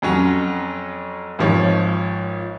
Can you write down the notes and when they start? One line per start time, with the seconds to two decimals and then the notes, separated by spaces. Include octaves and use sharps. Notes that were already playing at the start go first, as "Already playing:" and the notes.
0.02 F2 F#3 C#4
1.39 G#1 F3 C#5